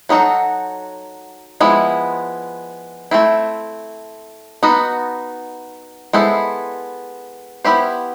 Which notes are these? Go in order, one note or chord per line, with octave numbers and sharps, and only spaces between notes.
F#3 B3 D#4 F#4 A4
F3 G#3 B3 E4
A3 C4 E4
B3 D#4 F#4
G#3 B3 E4 A4 C5
B3 E4 G4 C5